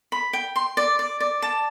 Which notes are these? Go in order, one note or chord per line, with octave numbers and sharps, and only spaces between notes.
B5
G5
C6
D5
D5
D5
A5